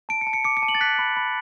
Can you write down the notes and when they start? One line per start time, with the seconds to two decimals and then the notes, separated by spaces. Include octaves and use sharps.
0.09 A5 D7
0.21 C#7
0.27 A5
0.33 C#7
0.44 D6 C#7
0.57 C#7
0.63 A5
0.69 F#7
0.75 A6
0.81 F#6 B6
0.99 B5
1.17 B5